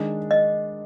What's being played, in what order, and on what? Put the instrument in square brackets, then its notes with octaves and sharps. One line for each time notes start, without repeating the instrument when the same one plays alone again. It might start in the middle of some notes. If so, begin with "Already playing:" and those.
Already playing: [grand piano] D#3 G#3 D4
[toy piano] D#5